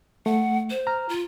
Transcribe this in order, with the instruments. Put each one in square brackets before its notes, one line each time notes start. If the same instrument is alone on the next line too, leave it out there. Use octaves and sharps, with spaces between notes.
[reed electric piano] A3 [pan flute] F#5
[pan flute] C5
[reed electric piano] A#5 F6
[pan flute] F4